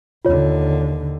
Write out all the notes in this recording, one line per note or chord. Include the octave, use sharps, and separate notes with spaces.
D#2 D3 F4 C#5